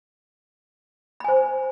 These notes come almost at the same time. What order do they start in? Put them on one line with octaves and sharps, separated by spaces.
B5 G#5 C5